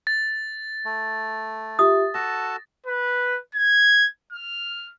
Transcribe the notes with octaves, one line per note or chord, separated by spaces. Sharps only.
A6
A3
F4 G4 E5 D#6
F#4 A4 A5 A#6
B4
G#6
F6